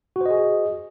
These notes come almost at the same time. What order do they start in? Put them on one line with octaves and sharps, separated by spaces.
F#4 C5 D#5 G#4